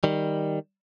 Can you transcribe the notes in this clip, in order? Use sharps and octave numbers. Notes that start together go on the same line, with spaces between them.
D#3 G3